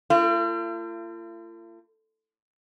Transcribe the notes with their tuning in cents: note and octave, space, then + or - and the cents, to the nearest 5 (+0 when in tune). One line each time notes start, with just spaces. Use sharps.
A3 +45 F4 -45